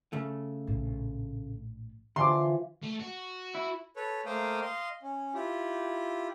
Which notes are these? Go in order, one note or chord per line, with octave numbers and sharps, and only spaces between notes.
C#3 A3
A#1 A2
D3 E3 F3 C6 D6
A3
F#4
E4
A4 B4 C#5
A3 A#3 C5 F5 G5 D#6
D#5 F5 C6
C#4
E4 F4 G4